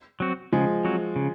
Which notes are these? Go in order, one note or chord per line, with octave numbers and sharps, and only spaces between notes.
F#3 C4 F#4
C#3 F3 G#3
F#3 C4 F#4
C#3